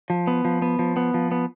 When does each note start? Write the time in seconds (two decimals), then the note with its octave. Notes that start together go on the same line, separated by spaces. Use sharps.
0.10 F3
0.27 B3
0.45 F3
0.62 B3
0.79 F3
0.96 B3
1.14 F3
1.31 B3